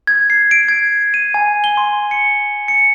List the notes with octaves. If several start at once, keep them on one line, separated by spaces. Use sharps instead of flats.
G#6
C7
D7
G#6
D#7
G#5
G7
C6
C#7
C#7